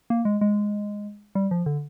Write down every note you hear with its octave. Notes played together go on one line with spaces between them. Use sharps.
A#3
G#3
G#3
G3
F3
D3